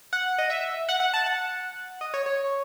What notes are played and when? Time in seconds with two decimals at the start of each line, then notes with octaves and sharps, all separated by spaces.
0.13 F#5
0.39 D#5
0.50 E5
0.89 F#5
1.00 F#5
1.14 A5
1.26 F#5
2.01 D#5
2.14 C#5
2.26 C#5